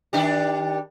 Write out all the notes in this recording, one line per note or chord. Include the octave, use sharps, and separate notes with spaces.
D#3 D4 G4